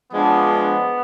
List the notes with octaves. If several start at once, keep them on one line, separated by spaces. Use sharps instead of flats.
F3 G#3 B3 D4